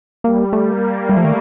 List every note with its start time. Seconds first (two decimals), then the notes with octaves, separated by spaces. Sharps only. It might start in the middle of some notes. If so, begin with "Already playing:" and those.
0.24 G3 A#3
0.53 A3
0.67 A#3
1.08 G3 A3
1.17 F3
1.24 D#3